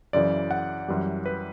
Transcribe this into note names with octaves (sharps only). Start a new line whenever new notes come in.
F#2 C#3 E3 D5
F#5
F#2 E3 G3
B4